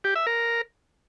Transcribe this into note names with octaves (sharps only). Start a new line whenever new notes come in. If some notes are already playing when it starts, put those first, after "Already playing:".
G4
E5
A#4